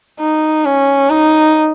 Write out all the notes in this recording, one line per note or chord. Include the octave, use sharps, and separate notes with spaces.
D#4
C#4
D#4